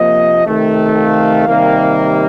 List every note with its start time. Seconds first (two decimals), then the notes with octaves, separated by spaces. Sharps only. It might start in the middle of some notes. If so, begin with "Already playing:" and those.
Already playing: C3 F3 A#3 D#5
0.44 C3 D#3 A3
0.96 F5
1.47 C3 D#3 G3 A#3